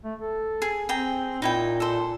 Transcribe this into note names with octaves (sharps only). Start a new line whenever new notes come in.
A3
A4
G#4
C4 G#4 G5 A#5
A#2 D#4 E4 G5
A4 C5